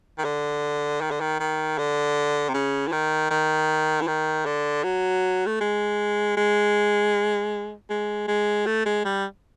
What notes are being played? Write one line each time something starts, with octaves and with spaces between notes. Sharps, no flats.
D#3
D3
D#3
D3
D#3
D#3
D3
C3
C#3
E3
D#3
D#3
E3
D#3
D3
F#3
A3
G#3
G#3
G#3
G#3
A3
G#3
G3